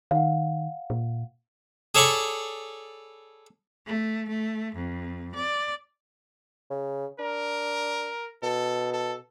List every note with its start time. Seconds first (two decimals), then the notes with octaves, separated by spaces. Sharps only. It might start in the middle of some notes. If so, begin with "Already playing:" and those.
0.11 D#3 F5 F#5
0.90 A#2
1.95 G#4 A4 C#5 D5 B5 C#6
3.87 A3
4.30 A3
4.75 F2
5.35 D5
6.70 C#3
7.19 D4 A#4
8.43 B2 A4
8.93 A4